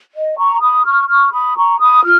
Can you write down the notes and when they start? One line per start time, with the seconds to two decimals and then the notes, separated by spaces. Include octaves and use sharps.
0.14 D#5
0.37 A#5 C#6
0.61 B5 D#6
0.85 C#6 F6
1.08 C#6 F6
1.32 B5 D#6
1.56 A#5 C#6
1.80 B5 D#6
2.04 F4 F6